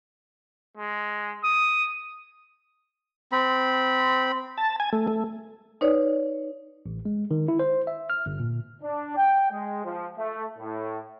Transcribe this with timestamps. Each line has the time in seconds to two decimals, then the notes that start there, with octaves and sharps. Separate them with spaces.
0.77 G#3
1.44 D#6
3.32 C4 B5
4.58 A5
4.80 G#5
4.93 A3
5.07 A3
5.81 D#4 B4 C#5 D5
6.86 A1
7.05 G#3
7.31 D#3
7.48 E4
7.59 C5
7.87 E5
8.10 F6
8.26 G1
8.40 A#2
8.82 D4
9.17 G5
9.51 G#3
9.85 F3
10.17 A3
10.58 A2